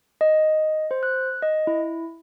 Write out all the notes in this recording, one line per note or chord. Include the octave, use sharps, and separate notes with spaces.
D#5
C5
F#6
D#5
E4